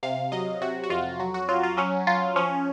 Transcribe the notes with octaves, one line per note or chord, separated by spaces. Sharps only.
C3 F5
F#3 D#5
C3 F#4
F#4
F2 F4
F#3 F#4
F#4
F#3 F4
F4
F#3 C#4
F#3 F4
F3 C#4